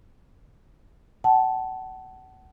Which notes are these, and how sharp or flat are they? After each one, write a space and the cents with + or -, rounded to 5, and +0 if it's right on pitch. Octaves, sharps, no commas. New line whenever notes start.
F#5 +30 A5 -10